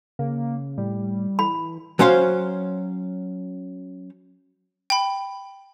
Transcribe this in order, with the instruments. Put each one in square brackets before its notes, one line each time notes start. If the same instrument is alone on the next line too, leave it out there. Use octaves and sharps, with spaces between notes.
[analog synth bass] C#3 [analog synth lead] A#3
[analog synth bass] A2 [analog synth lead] G3
[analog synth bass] E3 [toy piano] B5
[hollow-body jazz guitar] F#3 C#4 C5 F5
[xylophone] G5 B5